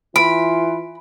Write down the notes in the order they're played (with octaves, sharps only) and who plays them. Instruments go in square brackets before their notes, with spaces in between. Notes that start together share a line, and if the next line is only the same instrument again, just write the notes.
[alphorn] E3 [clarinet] F4 [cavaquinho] B5 [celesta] D7